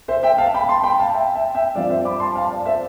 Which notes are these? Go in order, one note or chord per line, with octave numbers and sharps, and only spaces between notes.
C5 E5
E5 G5
F5 A5
G5 B5
A5 C6
G5 B5
F5 A5
E5 G5
E5 G5
E5 G5
G2 F3 C4 D5 F5
C5 E5
B5 D6
A5 C6
F5 A5
D5 F5
C5 E5